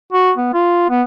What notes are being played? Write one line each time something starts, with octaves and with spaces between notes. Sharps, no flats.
F#4
B3
F4
B3